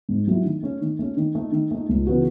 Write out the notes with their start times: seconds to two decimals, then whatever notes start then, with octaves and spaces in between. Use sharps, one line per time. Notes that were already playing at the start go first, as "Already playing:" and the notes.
0.09 G#2
0.27 F#3 A3 E4
0.45 D#3
0.63 A3 C#4
0.81 D#3
0.99 A3 C#4
1.17 D#3
1.35 A3 D#4
1.52 D#3
1.71 A3 D#4
1.89 C#2
2.07 C#3 E3 B3 F#4